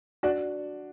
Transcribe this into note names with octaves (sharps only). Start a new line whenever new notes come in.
D4 F#4